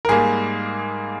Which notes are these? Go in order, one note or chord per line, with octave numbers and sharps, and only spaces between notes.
A#4
G#2 G3 A#3 G#4